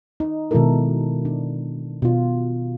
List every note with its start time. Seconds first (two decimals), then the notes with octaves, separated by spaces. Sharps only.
0.20 D#4
0.51 B2 D#3 G#3 E4 A4 A#4
1.25 D4
2.02 B2 F4